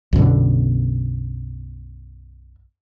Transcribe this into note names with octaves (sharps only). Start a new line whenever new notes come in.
B1 F#2 B2 D3